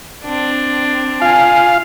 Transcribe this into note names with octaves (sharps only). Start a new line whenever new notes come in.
C4 D4
F4 F5 G#5